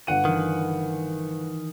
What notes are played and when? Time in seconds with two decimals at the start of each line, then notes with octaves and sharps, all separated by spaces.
0.07 G1 F#5 D#7
0.25 D#3 E3 D7